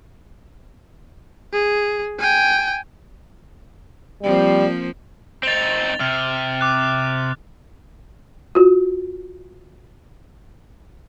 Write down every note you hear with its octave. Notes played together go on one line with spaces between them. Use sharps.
G#4
G5 G#5
F3 G3 A#3 C4
C4 D#4 A6 F7 G7
C3 F6
D6 F#6
F4 F#4